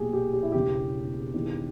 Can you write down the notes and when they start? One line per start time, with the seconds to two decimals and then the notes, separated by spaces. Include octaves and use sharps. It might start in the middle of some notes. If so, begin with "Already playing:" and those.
Already playing: B1 A#2 G4 G#4
0.13 G4
0.33 G4
0.43 E4
0.52 E1 E2 C#3 E3 G4
1.34 E1 E2 D#3